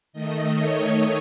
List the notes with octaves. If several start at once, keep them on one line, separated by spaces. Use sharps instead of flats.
D#3 A3 D#5
C#5